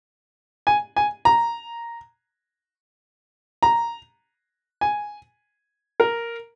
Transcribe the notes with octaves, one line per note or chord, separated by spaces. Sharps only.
G#5
G#5
A#5
A#5
G#5
A#4